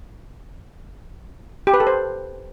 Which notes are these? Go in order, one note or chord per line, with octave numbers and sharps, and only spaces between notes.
G4
B4
A4
C5